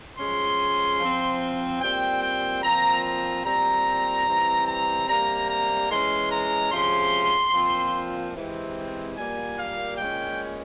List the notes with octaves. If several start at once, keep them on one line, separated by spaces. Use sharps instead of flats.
F3 G#3 C#4 C6
F3 C4
A#2 G3 C4 G5
G5
A#2 F3 C4 A#5
A#5
A#2 G3 C4 A#5
E3 G3 C4
A#5
C3 G3 A#3 A#5
A#5
E3 G#3 C#4 C6
A#5
C3 F3 G#3 C#4 C6
A#2 F3 C4
C3 E3 G#3 C4
A#2 G3 A#3 G#5
F5
A#2 G#3 C#4 G5